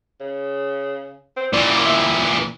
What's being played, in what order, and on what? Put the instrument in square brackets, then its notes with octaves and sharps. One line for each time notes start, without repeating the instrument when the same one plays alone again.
[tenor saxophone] C#3
C4
[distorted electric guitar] A#2 E3 [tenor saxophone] D5
[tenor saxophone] E4